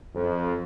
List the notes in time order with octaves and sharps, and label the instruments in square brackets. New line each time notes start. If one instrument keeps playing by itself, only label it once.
[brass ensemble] F2